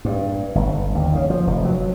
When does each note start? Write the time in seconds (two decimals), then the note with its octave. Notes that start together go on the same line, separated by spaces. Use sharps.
0.05 G2
0.55 G1
0.95 D#2
1.15 C#3
1.30 F3
1.47 F1
1.65 F#3